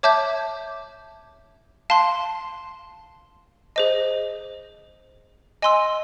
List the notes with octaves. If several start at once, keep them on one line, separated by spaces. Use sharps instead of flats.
C#5 E5 A5 D6 G6
F5 A5 C6
G#4 C5 D#5
D#5 G#5 C6 E6